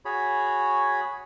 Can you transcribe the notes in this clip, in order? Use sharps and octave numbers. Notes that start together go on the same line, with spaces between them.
F#4 G#4 C#5 B5